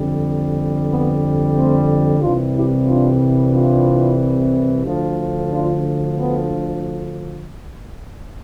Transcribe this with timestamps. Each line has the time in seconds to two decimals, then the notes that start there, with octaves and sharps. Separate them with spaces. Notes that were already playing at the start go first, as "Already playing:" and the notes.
Already playing: F2 D3 G3
0.89 B3
1.55 A3 C4
2.20 C2 C3 E3 G3 D4 F4
2.53 E4 G4
2.86 D4 F4
3.52 D4 F4
4.83 D2 D3 F3
5.49 D4 F4
6.16 B3